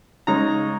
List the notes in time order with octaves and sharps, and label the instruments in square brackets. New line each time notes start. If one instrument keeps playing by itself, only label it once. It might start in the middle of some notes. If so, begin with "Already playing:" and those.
[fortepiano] C#3 G#3 D#4 A#5